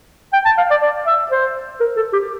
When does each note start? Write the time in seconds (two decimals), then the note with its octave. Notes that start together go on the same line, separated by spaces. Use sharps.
0.34 G5
0.45 A5
0.58 F5
0.70 D5
0.82 D5
1.07 E5
1.31 C5
1.80 A#4
1.97 A4
2.13 G4